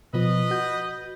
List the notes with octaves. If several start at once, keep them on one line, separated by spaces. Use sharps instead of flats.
B2 F3 B4 D#5
F#4 G6